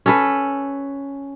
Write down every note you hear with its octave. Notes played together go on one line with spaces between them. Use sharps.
C#4 A4 B4